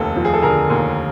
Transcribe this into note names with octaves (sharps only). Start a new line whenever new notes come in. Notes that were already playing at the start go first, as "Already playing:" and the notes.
Already playing: F1 D#2 A4
F3
G#4
A4
D3 G#4 A#4
D#2